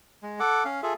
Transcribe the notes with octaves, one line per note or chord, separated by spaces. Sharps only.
G#3
A4 F#5 D6
C#4 F5
F4 G#4 A4 E5